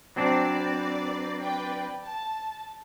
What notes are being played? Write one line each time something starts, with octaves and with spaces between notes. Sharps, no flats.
F#3 C4 D4 B4 D5
B4 D5 G5
A5